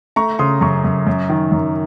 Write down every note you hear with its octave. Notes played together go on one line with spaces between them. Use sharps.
A3 A#5 C#6
C#3 C6 D#6
F#2 A#5 C#6
F#2
F#2
D#3
F#2